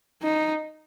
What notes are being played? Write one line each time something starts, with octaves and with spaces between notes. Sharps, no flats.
D#4